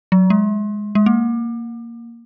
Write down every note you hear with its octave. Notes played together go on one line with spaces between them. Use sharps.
F#3
G#3
G#3
A#3